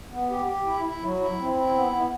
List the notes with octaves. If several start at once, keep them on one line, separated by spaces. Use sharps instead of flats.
B3
G4
G4
E4
E4
F#3
E4
C4
E4
B3
B3